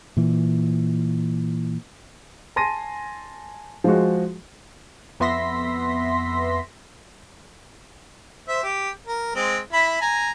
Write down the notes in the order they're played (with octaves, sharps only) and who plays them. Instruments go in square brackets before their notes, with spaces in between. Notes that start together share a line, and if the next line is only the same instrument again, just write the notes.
[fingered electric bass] A#2 E3
[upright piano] G#5 A5 C6 A#6 D#7
F3 G#3 F#4
[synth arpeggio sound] F2 B3 E5 C6 A#6 B6
[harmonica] C5 E5
G4
A#4
G#3 C4
E4 B5
G#5 A#5